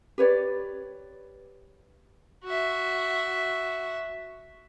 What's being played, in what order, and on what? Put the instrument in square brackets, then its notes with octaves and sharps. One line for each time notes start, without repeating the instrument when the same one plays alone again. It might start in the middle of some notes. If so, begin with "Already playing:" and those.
[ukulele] G4 B4 C#5 D5
[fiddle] F#4 E5